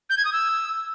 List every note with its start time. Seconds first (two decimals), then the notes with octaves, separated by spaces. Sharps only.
0.10 G6
0.17 G#6
0.25 D#6
0.33 E6